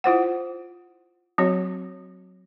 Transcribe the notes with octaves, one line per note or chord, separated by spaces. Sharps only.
E4 F4 C5 F#5
F#3 C4 F#4 C#5